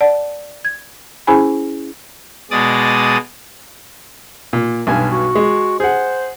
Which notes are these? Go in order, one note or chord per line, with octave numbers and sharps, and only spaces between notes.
D5 F#5 A5
G#6
C#4 E4 G#4 C5 G#5 B5
B2 G#3 D5 D#6 A6
A#2
B1 G2 G#5
F#4
G#3
G#4 C5 F#5